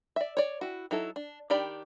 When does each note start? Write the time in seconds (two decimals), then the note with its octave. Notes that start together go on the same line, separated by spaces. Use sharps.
0.16 D5 E5
0.37 C#5 D5
0.61 E4 F#4
0.91 F#3 D#4 E4 A4
1.16 D4
1.50 D#3 D4 G4 D5 B5